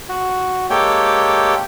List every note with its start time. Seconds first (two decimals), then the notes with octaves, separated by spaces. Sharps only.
0.09 F#4
0.70 G#3 A#3 G4 A4 C#5 G5